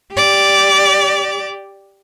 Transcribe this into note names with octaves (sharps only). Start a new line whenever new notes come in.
G4 D5